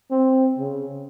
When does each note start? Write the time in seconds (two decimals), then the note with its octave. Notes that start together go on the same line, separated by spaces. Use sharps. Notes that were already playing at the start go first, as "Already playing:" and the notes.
0.11 C4
0.59 C#3